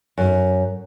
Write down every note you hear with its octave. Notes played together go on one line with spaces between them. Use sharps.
F#2